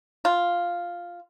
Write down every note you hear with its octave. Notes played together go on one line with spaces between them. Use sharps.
F4